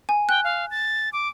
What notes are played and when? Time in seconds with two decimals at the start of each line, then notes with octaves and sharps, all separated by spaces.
0.09 G#5
0.29 G5 F#6
0.44 F5
0.71 A6
1.13 D6